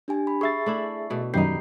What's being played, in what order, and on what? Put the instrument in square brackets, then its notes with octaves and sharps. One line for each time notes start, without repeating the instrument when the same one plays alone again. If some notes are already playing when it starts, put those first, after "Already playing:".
[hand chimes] D4 G4 G#5
B5
[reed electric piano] G#4 E5 A6 [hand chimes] C#6 C7
[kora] A3 D4 E4
B2 A3
[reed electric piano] F#2 D#3 [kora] G3 D#4 [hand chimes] G6 C7